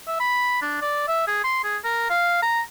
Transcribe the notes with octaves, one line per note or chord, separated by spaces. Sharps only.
E5
B5
D4
D5
E5
G#4
C6
G#4
A#4
F5
A#5